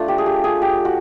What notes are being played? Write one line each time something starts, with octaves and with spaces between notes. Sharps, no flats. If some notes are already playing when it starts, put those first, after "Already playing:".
Already playing: A3 D4 F4
G4
G#4
G4
G#4
G4
F#4